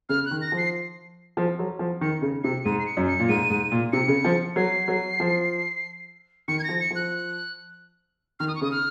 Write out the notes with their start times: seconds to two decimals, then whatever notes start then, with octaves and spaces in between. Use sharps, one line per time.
0.09 C#3 F6
0.26 F#6
0.31 D#3
0.41 A#6
0.52 F3
0.57 C7
1.37 F3
1.59 F#3
1.79 F3
2.01 D#3 C#7
2.22 C#3
2.44 C3 C#7
2.65 G#2 D#7
2.79 C7
2.86 C#7
2.97 F#2
3.08 C#7
3.19 A#2
3.29 G#2 D#7
3.50 G#2
3.72 A#2
3.93 C3 C#7
4.08 C#3
4.25 F3
4.56 F#3 C7
4.88 F#3
5.20 F3
6.48 D#3 C#7
6.59 G#6
6.64 F3 A#6
6.80 C#7
6.91 F3
6.96 F#6
8.40 D#3 F6
8.48 D#6
8.55 C#6
8.61 C#3 D#6
8.72 F6